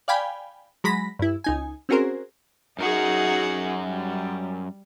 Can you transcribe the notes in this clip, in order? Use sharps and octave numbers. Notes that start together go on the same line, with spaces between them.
D5 F5 G5 G#5 B5
F#3 G#3 B5 A#6 B6
G2 E4
C#2 D#4 G#5
C4 C#4 F#4 G#4 A#4 C5
F#2 D#4 F#4 G#4 A#4 F#5
G3